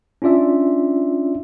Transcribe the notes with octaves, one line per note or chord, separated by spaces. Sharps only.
C#4 D4 F4 D5 E5